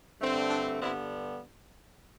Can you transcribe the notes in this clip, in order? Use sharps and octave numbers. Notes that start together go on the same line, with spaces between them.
G2 D3 A3 C4
D4
G2 D3 G3 B3 C4 E4